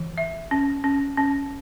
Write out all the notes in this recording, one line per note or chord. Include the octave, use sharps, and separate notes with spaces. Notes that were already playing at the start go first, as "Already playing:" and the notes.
Already playing: E3
E5
C#4
C#4
C#4